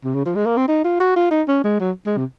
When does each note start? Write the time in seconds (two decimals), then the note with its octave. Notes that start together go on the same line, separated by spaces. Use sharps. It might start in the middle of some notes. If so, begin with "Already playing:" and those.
0.04 C3
0.14 C#3
0.25 F3
0.35 G#3
0.46 A#3
0.57 C4
0.68 D#4
0.84 F4
1.00 F#4
1.16 F4
1.31 D#4
1.48 C#4
1.64 G#3
1.80 F#3
2.06 G#3
2.17 C3